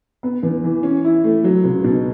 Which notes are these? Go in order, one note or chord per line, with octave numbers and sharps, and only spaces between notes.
B3
E2
E3
C#4
E4
A3
F#3
C#2
B2